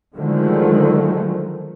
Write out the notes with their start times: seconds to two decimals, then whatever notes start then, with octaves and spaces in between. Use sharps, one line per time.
0.16 D3 D#3 F3 F#3 G#3 A3